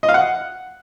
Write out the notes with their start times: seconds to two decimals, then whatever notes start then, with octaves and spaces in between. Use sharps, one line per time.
0.03 D#5
0.09 F5
0.14 F#5